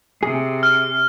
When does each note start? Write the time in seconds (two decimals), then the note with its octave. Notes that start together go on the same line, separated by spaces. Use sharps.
0.23 C3 G#4
0.63 F6